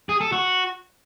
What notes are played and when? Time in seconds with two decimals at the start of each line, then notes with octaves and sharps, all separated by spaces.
0.09 G#4
0.21 A4
0.32 F#4